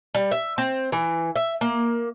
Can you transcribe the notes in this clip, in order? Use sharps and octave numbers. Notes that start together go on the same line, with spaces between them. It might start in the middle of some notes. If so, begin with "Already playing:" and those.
G3
E5
C4
E3
E5
A#3